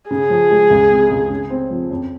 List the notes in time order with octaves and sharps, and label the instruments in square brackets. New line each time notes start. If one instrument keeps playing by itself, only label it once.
[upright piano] C#3 [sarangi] G#4
[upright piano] F3
G#3
C#2
C3
C#2
C#3
C4
F3
F2